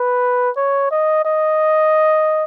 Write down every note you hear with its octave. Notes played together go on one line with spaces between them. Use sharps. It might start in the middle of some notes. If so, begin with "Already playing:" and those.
Already playing: B4
C#5
D#5
D#5